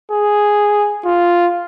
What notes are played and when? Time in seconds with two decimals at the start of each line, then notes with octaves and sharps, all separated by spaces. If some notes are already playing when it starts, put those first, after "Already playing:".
0.12 G#4
1.05 F4